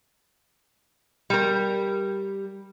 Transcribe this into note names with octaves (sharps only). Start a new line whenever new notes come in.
G3 A#4